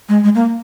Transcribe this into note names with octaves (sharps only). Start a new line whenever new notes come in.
G#3
G#3
A#3